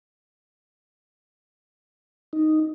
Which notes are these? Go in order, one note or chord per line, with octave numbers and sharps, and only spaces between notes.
D#4